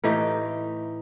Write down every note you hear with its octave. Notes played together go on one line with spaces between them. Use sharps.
A2 E3 D#4 G4